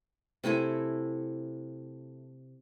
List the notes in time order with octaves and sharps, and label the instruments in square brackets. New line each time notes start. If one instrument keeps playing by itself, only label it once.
[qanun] C3 A3 E4 G#5